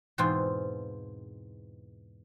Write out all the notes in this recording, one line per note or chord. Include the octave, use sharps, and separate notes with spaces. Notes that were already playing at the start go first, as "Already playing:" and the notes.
E2 G#2 B2 C4 F4 C5